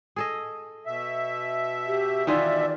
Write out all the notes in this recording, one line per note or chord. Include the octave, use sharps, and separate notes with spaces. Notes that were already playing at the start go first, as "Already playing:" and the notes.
G#4 A4 D#5
B2 E5
G4
D#3 E3 F4 D5